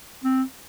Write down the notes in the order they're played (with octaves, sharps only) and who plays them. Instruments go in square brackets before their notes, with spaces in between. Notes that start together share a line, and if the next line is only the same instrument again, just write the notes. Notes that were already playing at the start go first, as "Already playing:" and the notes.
[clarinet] C4